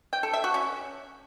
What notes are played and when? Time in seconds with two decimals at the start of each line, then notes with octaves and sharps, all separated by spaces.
0.13 G5
0.23 A4
0.33 E5
0.44 F#4
0.54 C#4